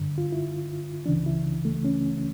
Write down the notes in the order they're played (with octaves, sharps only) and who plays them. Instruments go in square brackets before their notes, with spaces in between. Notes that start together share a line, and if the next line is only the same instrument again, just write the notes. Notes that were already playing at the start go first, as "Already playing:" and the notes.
Already playing: [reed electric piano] G2 D3
F4
E4
C#2 C#3 E3 D4
E4
A3
C#4